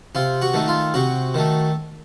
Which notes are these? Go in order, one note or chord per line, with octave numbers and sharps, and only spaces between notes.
C3 F4
F#4
D#3 A3
F4
C3 F#4
D#3 A3